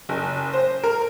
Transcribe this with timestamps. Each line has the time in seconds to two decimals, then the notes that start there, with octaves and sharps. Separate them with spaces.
0.09 F#1
0.53 C5
0.84 A#4